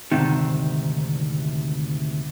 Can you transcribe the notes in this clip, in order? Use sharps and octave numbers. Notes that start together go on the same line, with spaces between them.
D2 G#2 C3 D#3